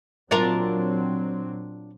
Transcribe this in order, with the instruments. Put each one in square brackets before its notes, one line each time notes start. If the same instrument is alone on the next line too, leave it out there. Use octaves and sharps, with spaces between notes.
[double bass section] A#2 F#3 C4 [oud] D4 F4 A#4